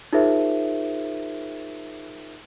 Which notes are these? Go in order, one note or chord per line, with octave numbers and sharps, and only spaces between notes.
D#4 F4 G#4 A#4 C5 E5